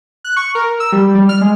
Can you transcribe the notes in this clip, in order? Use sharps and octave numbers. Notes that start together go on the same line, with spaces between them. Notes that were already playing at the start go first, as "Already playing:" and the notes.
F#6
C#6
A#4
E6
G3
G3
F6
G#3